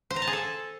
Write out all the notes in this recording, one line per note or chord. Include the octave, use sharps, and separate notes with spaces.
C5
A#5
A5
G#4
A4